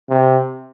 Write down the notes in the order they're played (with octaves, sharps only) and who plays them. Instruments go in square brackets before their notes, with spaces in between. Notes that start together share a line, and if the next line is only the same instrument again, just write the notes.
[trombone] C3